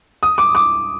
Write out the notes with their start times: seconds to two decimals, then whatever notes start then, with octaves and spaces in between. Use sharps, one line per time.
0.23 D#6
0.38 D6
0.55 D6